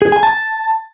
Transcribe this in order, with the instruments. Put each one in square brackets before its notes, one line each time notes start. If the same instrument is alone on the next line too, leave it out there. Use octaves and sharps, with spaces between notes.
[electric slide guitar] G#4
G#5
A5